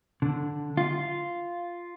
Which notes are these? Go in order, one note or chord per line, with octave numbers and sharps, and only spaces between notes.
D3
F4